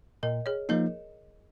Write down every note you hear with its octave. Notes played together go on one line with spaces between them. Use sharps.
A#2 A#4 D#5
G#4 C#5
F3 A#3 D#4 A#4 D#5